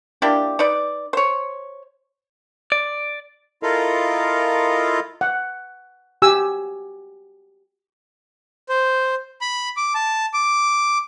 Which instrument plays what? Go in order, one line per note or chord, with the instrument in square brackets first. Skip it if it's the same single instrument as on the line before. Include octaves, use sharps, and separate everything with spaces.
[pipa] A#3 D4 E4 G4
D#4 B4 D5
C5 C#5
[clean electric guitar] D5
[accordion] E4 F4 A4 A#4 D#5 F5
[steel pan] F#5
F#4 G4 G#5 E6
[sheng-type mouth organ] C5
B5
D6
A5
D6